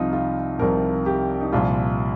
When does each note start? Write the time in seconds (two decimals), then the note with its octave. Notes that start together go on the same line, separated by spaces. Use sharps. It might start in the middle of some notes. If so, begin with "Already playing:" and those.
Already playing: C2 C3 F3 D#4 F4
0.13 F4
0.59 C2 C3 F3 A#4
1.06 G4
1.41 D#4
1.52 C2 A#2 F3 F4